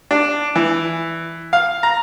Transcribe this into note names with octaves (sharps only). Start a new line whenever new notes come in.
D4
E3
F5
A#5